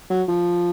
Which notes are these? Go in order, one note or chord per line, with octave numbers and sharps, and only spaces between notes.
F#3
F3